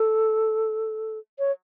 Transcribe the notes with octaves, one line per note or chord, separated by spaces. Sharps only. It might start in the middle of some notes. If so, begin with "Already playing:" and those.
Already playing: A4
C#5